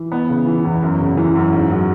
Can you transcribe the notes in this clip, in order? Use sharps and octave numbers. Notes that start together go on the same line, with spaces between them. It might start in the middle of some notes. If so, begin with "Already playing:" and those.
Already playing: E3
B3
C#3
E3
E2
F#2
C#3
E3
F#2
G#2
F#3